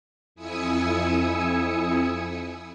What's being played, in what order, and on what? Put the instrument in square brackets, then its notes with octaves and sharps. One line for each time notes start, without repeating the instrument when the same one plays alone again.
[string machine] F2 E4 G#5 D#6 E6 C#7